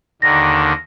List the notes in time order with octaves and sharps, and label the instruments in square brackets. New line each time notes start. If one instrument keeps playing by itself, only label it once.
[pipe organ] D#2 D3 D#3 [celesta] A#6